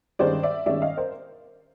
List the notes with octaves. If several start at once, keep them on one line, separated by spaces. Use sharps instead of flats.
G2 D#3 G#3 C#4 C5 D5
D5 E5
G2 D#3 G#3 C#4 D5 E5
D#5 F5
A#4 C5